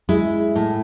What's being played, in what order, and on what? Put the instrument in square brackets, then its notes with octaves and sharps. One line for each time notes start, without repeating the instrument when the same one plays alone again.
[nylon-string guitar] G#3 E4
A2